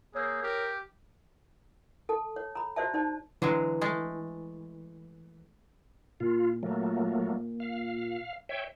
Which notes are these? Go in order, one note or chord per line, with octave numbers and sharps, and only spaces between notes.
A#3 G#4 C#5 E6 G6
G4 A#4
A4 A5
C#5
A#5 B5
F#4 C5 D5 E5 A5
D#4 C5 D5 A5
D3 E3 F#3 G#3
G#3 A3
A#2 F4
F#3 A3 A#3
F5
C#5 E5 G5